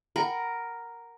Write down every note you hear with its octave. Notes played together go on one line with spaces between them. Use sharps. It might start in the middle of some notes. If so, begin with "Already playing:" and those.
A#4 F#5 G5 B5